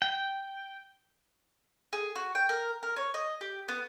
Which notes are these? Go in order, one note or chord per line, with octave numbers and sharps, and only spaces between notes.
G5
G#4
F#4
G5
A#4
A#4
C#5
D#5
G4
B3